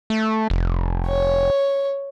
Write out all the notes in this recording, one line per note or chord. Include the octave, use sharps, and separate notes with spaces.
A3
F1
C#5